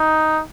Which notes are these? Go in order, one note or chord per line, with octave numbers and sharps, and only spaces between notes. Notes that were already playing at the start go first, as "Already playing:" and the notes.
Already playing: D#4